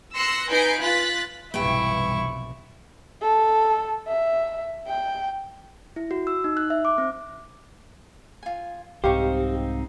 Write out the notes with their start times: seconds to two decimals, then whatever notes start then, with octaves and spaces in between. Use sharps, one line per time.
0.17 C6 E6 F#6 A#6 C#7
0.50 D#4 B4 G#5 G6 C7 D7
0.81 F4 F#6 A6 B6
1.54 F1 B1 G2 E3 E4 G5 C#6
3.22 A4
4.08 E5
4.87 G5
5.96 E4
6.11 F#4
6.27 E6
6.44 D#4
6.57 F#6
6.70 E5
6.85 D6
6.98 C4
8.43 F4 G#5
9.04 C2 G#2 C4 D#4 G4 C5 F5 C#6